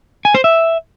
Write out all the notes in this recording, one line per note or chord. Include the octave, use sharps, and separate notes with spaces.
G#5
C5
E5